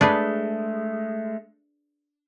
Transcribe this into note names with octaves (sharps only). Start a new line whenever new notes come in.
G#3 A3 D4 G#4 B4